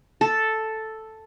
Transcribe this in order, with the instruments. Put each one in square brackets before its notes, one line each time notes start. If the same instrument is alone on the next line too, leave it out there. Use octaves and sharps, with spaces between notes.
[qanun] A4